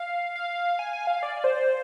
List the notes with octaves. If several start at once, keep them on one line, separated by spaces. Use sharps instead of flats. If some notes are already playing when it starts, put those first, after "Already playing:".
Already playing: F5
F5
G#5
G#5
F5
D5
C5